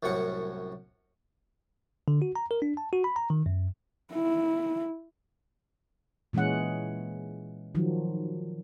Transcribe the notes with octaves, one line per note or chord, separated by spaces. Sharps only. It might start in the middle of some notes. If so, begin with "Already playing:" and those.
C2 F#2 A2 C#4 F#5
D3
F#4
A#5
A#4
D4
A5
F#4
B5
A#5
D#3
F#2
E4
A#2 E3 G#3 C#4 F#5
D#3 F3 F#3